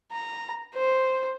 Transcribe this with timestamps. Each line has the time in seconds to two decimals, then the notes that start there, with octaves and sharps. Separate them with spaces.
0.11 A#5
0.74 C5